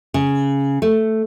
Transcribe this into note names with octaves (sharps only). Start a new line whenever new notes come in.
C#3
A3